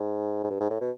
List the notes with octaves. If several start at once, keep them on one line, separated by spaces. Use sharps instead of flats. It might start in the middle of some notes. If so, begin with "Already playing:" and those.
Already playing: G#2
G#2
G2
G#2
A2
B2